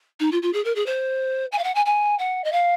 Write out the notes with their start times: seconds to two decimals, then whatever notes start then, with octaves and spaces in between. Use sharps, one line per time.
0.20 D#4
0.32 F4
0.42 F4
0.53 G#4
0.65 A#4
0.76 G#4
0.86 C5
1.52 G#5
1.58 F5
1.64 F#5
1.75 G#5
1.86 G#5
2.19 F#5
2.44 D#5
2.52 F5